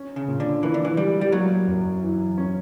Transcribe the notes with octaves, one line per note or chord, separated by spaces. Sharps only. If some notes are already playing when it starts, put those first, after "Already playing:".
Already playing: C#4
C#3
A#2
D3
E3 A#3
D3
E3
G3 E4
G3
F#3 A#3
F#2
E3
C#4